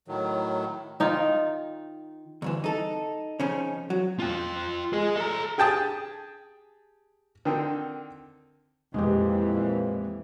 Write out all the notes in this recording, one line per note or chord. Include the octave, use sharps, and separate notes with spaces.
A2 D#3 F#3
D#3 D#4 F4
D2 G2 E3
D#4 A4
C#3 F3 C#4 D#4
F#3
F4 G5
G#4 D#5
A4 A#5
G4 G#4 G5 A5 D#6
D3 D#3 C4
F2 A#2 E3 G#3 G4